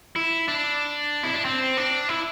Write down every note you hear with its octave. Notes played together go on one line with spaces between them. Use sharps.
E4
D4
E4
D4
C4
D4
E4